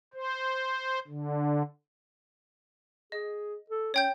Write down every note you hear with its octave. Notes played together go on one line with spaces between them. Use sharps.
C5
D3
G#4 D#5
A4
C#4 C#5 G5 G6